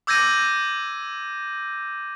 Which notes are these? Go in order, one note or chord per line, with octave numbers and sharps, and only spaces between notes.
D6 E6 G6 G#6 A#6 D#7